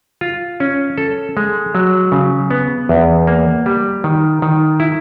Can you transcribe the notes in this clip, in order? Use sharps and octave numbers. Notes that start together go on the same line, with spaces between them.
F4
C#4
A4
G#3
F#3
C#3
B3
E2
A#3
G3
D#3
D#3
E4